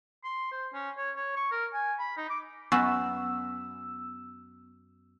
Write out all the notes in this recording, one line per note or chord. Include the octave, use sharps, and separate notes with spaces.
C6
C5
C#4
C#5
C#5
C#6
A#4
G#5
B5
D#4
D6
F#2 B3 F#4 B4 G#5 C#6 E6